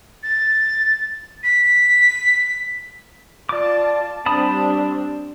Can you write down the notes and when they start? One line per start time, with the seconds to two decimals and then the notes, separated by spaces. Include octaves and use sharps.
0.23 A6
1.43 B6
3.49 F4 D5 A5 D6
4.26 G3 C4 D4 A5 B5 D#6